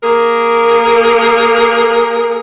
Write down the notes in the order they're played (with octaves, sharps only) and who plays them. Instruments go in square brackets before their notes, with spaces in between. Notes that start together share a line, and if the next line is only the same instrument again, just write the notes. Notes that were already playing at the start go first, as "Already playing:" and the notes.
[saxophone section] A#3 G#4 A#4